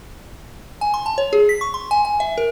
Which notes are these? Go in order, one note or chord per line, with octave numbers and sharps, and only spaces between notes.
G#5
C6
A5
C#5
G#4
B6
C#6
C6
G#5
G#5
E5
A#4